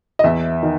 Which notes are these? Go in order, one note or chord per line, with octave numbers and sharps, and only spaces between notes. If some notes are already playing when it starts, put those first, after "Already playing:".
D#5
E2 E5
D#3